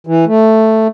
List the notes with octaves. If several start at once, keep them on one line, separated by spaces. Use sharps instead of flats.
E3
A3